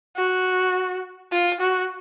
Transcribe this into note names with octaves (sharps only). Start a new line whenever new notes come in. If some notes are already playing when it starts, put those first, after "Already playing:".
F#4
F4
F#4